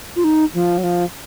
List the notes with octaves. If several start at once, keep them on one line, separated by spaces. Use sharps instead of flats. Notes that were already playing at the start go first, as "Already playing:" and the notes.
F4
D#4
F3
F#3
F3